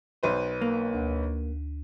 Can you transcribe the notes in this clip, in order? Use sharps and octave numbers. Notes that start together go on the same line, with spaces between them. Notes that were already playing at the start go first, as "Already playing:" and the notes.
B1 B4 C5
A#3
D2